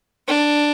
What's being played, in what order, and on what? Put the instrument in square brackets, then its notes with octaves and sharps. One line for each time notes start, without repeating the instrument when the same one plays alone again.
[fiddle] D4